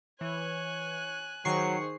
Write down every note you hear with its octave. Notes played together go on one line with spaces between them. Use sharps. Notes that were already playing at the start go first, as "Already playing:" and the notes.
E3 C#5 G#5 F#6
D#3 F#3 G#4 C5 C#6 C7